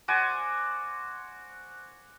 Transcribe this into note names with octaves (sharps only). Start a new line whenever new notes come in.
F#4 C5 D5 G#5